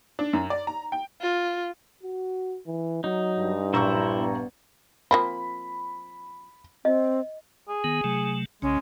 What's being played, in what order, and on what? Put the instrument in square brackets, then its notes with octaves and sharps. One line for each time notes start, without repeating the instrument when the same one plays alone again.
[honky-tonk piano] D4
F#2
D5
A#5
G5
[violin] F4
[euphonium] F#4
E3
[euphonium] F#3 [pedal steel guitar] D#4
[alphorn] G2
[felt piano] A#1 A#5 C#6 [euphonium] F#2 [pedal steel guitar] E4 C5 E5
[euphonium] B3
[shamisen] F3 A#3 C4 [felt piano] B5
[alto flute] C4 [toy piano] D#5
[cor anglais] G#4
[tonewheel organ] D#3 B3
C3 F#3 A3
[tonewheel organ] B1 C#3 [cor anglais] G#3 [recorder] C#4